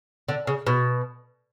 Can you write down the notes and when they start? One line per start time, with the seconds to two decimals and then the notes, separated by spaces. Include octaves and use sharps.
0.29 D3
0.47 C#3
0.67 B2